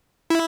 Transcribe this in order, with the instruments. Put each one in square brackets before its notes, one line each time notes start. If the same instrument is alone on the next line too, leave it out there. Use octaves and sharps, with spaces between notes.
[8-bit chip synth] E4